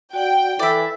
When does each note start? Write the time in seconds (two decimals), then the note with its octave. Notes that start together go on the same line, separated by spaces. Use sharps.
0.13 F#4 D5 F#5 G5
0.59 E3 A4 D5 E5